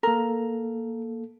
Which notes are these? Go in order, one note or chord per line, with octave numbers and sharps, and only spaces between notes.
A#3 A4 A#4